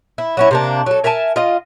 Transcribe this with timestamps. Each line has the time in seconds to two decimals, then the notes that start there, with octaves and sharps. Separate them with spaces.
0.18 E4
0.37 F#3 C#4 E4
0.51 C3 A#3 D4
0.86 F#3 A4
1.04 A#4 E5 G#5 A5
1.36 F4 D#5